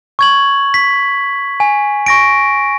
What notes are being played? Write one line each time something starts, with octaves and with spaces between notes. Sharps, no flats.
C#6 G#6 F#7
B6
G#5
C#6 A#6 D7